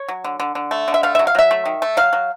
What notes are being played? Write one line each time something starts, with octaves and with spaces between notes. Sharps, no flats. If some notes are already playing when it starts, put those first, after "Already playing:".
Already playing: C#5
F#3
D3
D3
D3
A3
D3
E5
A3 F5
E5
F#3
F5
F#3 E5
A3
D#3
A3
F#3 F5
F#3